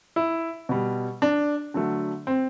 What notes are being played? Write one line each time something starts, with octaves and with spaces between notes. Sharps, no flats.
E4
B2 G3
D4
D3 F#3 A3
C4